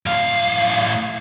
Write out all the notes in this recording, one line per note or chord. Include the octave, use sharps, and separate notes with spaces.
A2 F5